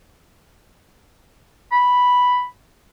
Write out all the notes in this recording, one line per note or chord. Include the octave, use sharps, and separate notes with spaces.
B5